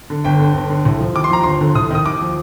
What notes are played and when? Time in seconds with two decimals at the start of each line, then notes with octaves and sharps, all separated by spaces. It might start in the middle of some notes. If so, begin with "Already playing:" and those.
0.10 D3
0.24 G1 G5
0.39 D3
0.54 G1
0.70 D3
0.85 C2
0.99 F3
1.15 D#2 D6
1.24 C6
1.30 F3 A#5
1.43 G1 C6
1.61 D3
1.75 C2 D#6
1.91 D#3 D#6
2.05 D#2 D6
2.21 F3